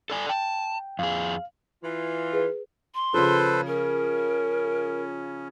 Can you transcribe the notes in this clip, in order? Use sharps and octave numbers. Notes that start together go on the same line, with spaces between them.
A4 D5 G#5
G5 A5
F2 G#4 F5
E3 F4
G#4 B4
C6
C#3 F3 A4 B4 C5
C#4 A#4